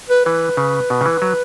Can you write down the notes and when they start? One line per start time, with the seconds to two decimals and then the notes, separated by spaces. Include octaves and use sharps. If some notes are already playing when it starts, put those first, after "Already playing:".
0.10 B4
0.25 E3 B4
0.57 C#3
0.90 B2
1.01 C#3
1.06 E3
1.22 F#3